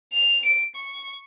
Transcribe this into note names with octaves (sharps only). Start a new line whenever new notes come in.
F7
D7
C#6